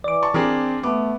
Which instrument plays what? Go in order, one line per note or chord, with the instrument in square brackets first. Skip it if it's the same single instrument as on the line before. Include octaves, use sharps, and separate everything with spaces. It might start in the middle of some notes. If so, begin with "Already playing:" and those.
[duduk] E3 [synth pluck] D5 D6
[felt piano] A5 C#6
[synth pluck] E3 [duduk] C4 [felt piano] D4 G#4 A#4
[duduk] A3 [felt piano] B3 D6